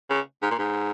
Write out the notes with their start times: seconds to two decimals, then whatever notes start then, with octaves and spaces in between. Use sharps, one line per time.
0.10 C#3
0.42 G#2
0.50 A#2
0.58 G#2